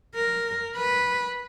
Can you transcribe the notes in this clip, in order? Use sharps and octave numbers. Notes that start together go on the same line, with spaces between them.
A#4
B4